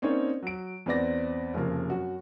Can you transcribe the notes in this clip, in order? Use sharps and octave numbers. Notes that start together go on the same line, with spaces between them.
A#3 C4 C#4 D#4 C#5 D5
F#3 D7
E2 C4 B4 D5 A#6
F1 C#3 F3 A#3
F#2 F#4